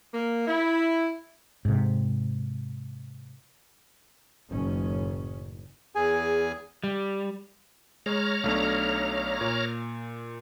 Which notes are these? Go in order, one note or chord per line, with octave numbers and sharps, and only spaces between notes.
A#3
E4
G#2 C3
F#1 A2 D#3 C#4
E2 G#4 G#5
G3
G#3 C#5 A#5 F6
B1 A3 D4
A#2